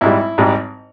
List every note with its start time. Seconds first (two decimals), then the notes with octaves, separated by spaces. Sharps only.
0.01 G#1 G#2 G3 E4
0.38 G#1 G#2 G3